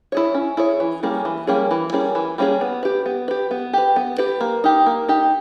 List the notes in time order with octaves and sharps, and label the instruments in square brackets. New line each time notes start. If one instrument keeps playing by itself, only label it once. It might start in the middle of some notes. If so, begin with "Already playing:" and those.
[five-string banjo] E4 G#4 C#5
C#4
E4 G#4 C#5
E3
G3 A#3 C#4 G#4
E3
G3 A#3 C#4 G#4
E3
G3 A#3 C#4 G#4
E3
G3 A#3 C#4 G#4
B3
G4 B4
B3
G4 B4
B3
G4 B4
B3
G4 B4
A#3
D#4 G4
A#3
D#4 G4